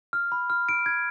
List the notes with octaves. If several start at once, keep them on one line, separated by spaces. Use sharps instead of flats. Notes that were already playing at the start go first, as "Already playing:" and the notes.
F6
B5
F6
D7
G#6